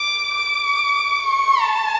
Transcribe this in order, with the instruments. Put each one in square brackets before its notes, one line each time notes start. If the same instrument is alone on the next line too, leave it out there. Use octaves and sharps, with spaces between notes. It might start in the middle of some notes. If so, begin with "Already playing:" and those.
Already playing: [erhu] D6
D6
C#6
A5